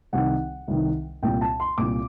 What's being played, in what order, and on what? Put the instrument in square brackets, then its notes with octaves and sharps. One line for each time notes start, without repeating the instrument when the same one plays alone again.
[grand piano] C2 C3 D#3 F#5
C2 C3 D#3
C2 A#2 G5
A5
C6
C2 A#2 D6